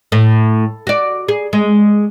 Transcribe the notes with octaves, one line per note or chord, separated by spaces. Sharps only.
A2
F#4 D5
G#4
G#3